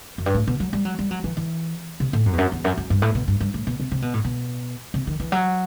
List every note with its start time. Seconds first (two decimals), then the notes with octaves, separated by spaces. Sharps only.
0.18 F#2
0.26 G2
0.34 A2
0.47 B2
0.60 F#3
0.73 G3
0.85 F#3
0.99 G3
1.11 F#3
1.24 E3
1.37 E3
2.00 C3
2.13 A2
2.26 F#2
2.33 E2
2.38 F#2
2.52 E2
2.64 F#2
2.77 F#2
2.90 G2
3.02 A2
3.15 B2
3.28 G2
3.40 G2
3.54 A2
3.67 B2
3.80 C3
3.92 C3
4.02 B2
4.13 A2
4.24 B2
4.94 C3
5.07 D#3
5.20 E3
5.32 F#3